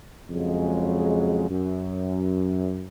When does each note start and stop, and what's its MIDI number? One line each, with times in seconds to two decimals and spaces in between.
0.29 1.48 41
0.29 1.48 49
0.29 1.48 54
0.29 1.48 56
1.49 2.86 42